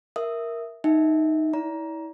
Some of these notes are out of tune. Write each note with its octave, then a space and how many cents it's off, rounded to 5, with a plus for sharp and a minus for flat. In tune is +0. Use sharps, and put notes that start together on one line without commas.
A#4 +5 E5 +0 D#6 +0
D#4 +0 E5 -20 G5 +0
E4 -35 D5 -35 A#5 +15